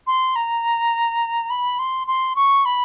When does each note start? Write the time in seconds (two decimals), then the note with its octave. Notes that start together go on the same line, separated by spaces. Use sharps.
0.07 C6
0.36 A#5
1.50 B5
1.79 C6
2.07 C6
2.36 C#6
2.65 B5